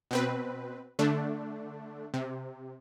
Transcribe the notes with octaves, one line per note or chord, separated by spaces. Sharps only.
B2 C4 B4
D3 A3 D4
C3